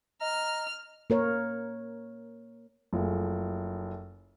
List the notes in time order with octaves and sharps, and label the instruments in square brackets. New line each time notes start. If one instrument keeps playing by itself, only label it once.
[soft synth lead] D#5 [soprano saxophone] A#5 [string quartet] F6
[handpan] A#3 A#4 C#5
[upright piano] F#1 F3 A3 G#4